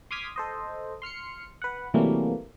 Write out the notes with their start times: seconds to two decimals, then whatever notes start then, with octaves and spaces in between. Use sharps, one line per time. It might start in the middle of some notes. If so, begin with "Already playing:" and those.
0.11 C6 D6 D#6 F6 G#6 B6
0.36 A4 C5 D#5
1.02 C6 F6 C7 C#7
1.62 B4 F#5
1.94 C3 E3 F#3 G3 A3 A#3